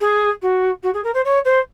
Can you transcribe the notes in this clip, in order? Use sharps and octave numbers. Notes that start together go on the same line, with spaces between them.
G#4
F#4
F#4
G#4
A#4
C5
C#5
C5